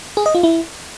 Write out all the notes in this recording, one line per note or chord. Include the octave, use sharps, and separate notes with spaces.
G#4
D#5
F4
E4